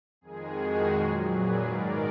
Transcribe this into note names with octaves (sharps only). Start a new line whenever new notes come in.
F2 D#3 G#3 G#4
F#4
A#2 F#3
G#4 B4
G#2 D#3 G#3 A#4 D5